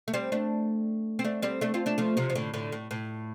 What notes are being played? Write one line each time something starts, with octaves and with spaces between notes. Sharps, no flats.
A3
G3 C4
A3 D4
C4
A3 D4
G3 C4
A3 D4
C4 F4
A3 D4
F3 A3
C3 F3
F3
A2 D3
A2 D3
A2
A2